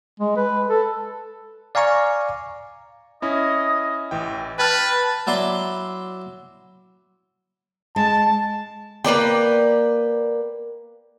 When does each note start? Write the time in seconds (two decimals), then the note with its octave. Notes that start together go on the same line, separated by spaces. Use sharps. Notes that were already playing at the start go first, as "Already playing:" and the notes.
0.20 G#3
0.37 B4
0.69 A4
1.75 D5 F5 G#5 A#5 C#6
3.22 C#4 E4 D#5
4.11 A1 E3 G5
4.59 B4 G5 A5 F6
5.27 F#3 E4 D5 C6
7.96 G#3 A5
9.04 A#3 B4 D5 G5